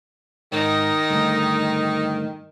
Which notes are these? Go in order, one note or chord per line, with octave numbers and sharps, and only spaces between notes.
G#2 D#3 D#4
D2 G2 A3